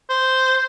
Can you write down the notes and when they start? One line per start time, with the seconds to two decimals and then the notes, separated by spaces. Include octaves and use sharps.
0.10 C5